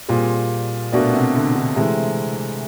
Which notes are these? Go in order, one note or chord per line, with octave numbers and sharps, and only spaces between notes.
A#2 G3 C4 F4 G#4
B2 A3 D4 F#4 A#4 D5
C3
D3
D3
C3 E3 G#3 A3 C4